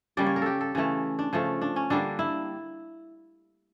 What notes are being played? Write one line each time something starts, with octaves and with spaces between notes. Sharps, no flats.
C#3 G3 A#3 D5
C#5
A#4
G4 A4
A4
C#3 E3 A3
D4
C#3 F3 A3
D4
C#4
D3 G3 A#3 D4
E4